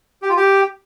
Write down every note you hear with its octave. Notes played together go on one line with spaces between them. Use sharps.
G4
F4
G4